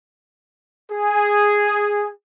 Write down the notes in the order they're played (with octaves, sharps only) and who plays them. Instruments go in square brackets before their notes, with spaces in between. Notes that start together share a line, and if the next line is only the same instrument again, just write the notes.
[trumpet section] G#4